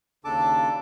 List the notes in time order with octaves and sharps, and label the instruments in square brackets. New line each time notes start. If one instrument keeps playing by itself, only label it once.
[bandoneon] D#2 C#3 D4 A4 A5 D6